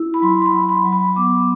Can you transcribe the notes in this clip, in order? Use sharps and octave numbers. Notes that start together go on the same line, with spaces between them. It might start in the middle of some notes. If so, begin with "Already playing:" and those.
Already playing: E4
B5
F#3 C6
C6
B5
F#3
B5
F#3
B5
B3 D6